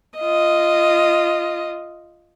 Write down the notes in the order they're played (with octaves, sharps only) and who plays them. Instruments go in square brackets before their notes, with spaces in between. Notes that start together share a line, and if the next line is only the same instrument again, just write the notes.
[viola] F4 D#5